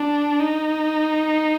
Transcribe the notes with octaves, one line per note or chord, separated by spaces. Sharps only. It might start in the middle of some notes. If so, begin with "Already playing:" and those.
Already playing: D4
D#4